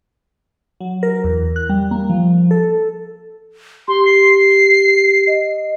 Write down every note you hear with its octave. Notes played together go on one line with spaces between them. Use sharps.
F#3
A#4
E2
F#6
G3
A#3
F3
A4
G4 C6
C7
D#5